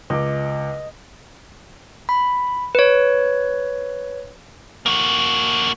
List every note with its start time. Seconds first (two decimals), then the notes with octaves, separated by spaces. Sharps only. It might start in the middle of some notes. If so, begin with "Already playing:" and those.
0.10 C#2 D#5 D6
2.09 B5
2.75 B4 C#5
4.86 A#3 F#4